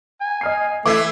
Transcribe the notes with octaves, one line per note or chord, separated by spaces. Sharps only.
G#5
D#5 F6 C7
E3 A3 E4 D6 E6 C7